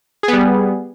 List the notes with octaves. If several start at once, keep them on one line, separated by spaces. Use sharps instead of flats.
G3 B3 G#4